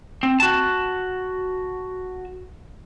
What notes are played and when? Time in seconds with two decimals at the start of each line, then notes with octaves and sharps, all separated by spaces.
0.23 C4
0.40 F#4 A5